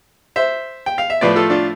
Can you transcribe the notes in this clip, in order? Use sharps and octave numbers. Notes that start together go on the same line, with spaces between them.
C5 E5
G5
F5
E5
A2 F3 A3 B4 D5
F4 A4
D4 F4